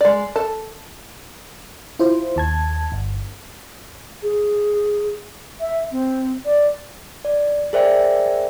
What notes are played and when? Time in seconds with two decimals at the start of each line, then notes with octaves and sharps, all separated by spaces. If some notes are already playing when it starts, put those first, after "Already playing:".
0.01 G#3 D5
0.36 A4 A5
1.99 E4 F4 C5
2.36 D#2 A5 G#6
2.92 G1
4.23 G#4
5.60 E5
5.92 C4
6.45 D5
7.25 D5
7.73 G#4 A#4 C5 D5 E5 G5